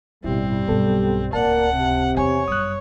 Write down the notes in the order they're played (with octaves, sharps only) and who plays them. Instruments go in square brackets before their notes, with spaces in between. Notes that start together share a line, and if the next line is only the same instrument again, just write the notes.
[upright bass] A1 G2 [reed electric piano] B2 E4 [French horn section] G3 [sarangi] C4
[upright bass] B1 G2 [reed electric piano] B3 A4
[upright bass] D1 C#2 [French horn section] A#3 A#4 D5 [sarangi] F#5 [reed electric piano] A5
[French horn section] C3
[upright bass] E2 C#3 [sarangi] C#5 [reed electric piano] G#5
[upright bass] G1 F#2 [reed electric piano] D#6 F#6